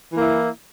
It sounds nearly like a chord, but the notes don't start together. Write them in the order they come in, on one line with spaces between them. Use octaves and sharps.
E3 A#3 E4